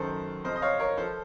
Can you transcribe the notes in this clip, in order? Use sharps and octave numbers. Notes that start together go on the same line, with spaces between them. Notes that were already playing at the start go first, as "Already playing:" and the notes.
Already playing: F#2 D#3 A4 C5
F2 C3 F3 C5 D#5
D#5
C#5 F5
A#4 C#5
F3 A4 C5